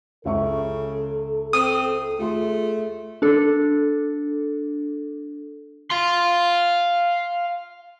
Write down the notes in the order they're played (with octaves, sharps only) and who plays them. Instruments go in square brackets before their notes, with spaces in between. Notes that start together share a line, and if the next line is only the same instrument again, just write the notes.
[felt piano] C#2 E5 C#6 [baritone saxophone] C#3 [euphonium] A4
[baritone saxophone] C4 [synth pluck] D#6
[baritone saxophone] A3 [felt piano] F4 G#4 C6
[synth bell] D4 A4
[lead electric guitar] F5 C6